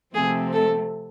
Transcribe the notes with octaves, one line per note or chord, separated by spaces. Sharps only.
C3 F3 A3 C4 G#4
A4